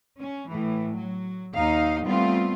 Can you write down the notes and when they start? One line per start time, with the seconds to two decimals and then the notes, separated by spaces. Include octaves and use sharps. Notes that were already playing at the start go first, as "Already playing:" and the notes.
0.18 C#4
0.48 A2 E3
0.93 F#3
1.54 D#2 D#4 F5
2.04 G3 A3 B3 C4 F4